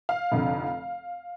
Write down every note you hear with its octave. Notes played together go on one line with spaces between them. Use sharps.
F5
F1 F2 D3